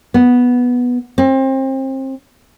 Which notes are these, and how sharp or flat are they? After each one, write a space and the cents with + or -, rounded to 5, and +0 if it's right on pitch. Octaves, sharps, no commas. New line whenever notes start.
B3 -5
C4 +30